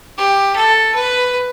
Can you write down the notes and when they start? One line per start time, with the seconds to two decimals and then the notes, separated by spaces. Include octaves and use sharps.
0.17 G4
0.56 A4
0.94 B4